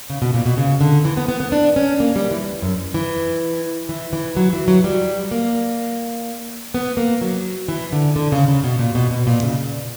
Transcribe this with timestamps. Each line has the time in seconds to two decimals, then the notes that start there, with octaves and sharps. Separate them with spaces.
0.10 C#3
0.22 B2
0.34 A#2
0.46 B2
0.57 C#3
0.81 D3
1.05 E3
1.17 B3
1.28 B3
1.40 B3
1.52 D4
1.76 C#4
2.00 A#3
2.16 G3
2.31 E3
2.62 F#2
2.94 E3
3.89 E3
4.13 E3
4.37 F#3
4.53 E3
4.68 F#3
4.84 G3
5.31 A#3
6.74 B3
6.97 A#3
7.21 F#3
7.68 E3
7.92 D3
8.16 D3
8.32 C#3
8.48 C#3
8.64 B2
8.79 A#2
8.95 B2
9.11 B2
9.27 A#2
9.43 C#3